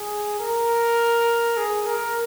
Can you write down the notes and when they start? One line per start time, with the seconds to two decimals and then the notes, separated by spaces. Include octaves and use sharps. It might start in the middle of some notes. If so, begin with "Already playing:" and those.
Already playing: G#4
0.39 A#4
1.57 G#4
1.86 A#4